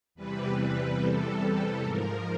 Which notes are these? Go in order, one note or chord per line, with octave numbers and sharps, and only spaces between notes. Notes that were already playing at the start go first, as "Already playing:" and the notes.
E2 C3 E3 G3 B4
B4
A4
G#2 F3 A#4